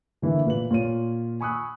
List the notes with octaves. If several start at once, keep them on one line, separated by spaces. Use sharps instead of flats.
D3 E3 A#3 E4
A#2 B4 F#7
A#2 F4 C#5 D#7
G#5 B5 C#6 D#6 E6 F#6